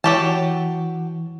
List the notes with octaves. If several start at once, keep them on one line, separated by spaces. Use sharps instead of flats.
E3 F#3 G4 A5